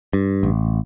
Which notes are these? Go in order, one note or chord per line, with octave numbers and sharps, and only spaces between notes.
G2
A1